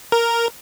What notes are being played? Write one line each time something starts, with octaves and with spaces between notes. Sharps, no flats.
A#4